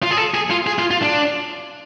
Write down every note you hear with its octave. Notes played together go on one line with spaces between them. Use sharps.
F4
G#4
A4
G#4
F4
G#4
F4
F4
D4